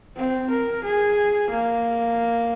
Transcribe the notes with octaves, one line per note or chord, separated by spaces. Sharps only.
C4
A#4
G#4
A#3